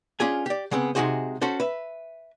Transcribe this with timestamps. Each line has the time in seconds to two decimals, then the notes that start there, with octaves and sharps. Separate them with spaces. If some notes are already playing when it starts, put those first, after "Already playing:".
0.20 C#4 D4 F4 G#4 G#5
0.46 G4 D5
0.71 C#3 G#3 B3 C4
0.95 C3 G#3 D#4 F#4 G#4 C5
1.41 C#4 F#4 A4 C5
1.60 B4 E5